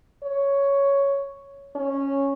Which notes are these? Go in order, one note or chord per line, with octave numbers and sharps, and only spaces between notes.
C#5
C#4